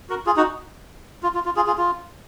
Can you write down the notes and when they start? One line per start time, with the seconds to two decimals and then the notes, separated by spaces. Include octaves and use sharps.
0.09 F#4 A#4
0.26 F4 G#4
0.37 D#4 F#4
1.23 F4
1.35 F4
1.45 F4
1.56 F4 G#4
1.67 F4 G#4
1.78 F4